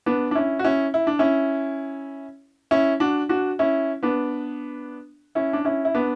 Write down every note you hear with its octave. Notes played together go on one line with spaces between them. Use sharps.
B3 D4
D4
C#4 E4
F#4
C#4 E4
E4
D4
C#4 E4
C#4 E4
D4 F#4
D4 F#4
C#4 E4
B3 D4
C#4 E4
D4
C#4 E4
E4
B3 D4